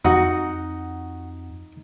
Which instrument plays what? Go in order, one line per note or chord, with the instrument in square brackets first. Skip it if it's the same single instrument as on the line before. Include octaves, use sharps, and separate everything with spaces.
[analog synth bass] F2 [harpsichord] D#4 [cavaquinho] F#4 [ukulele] F#5